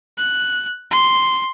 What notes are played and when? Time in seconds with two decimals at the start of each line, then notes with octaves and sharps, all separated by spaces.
0.18 F#6
0.91 C6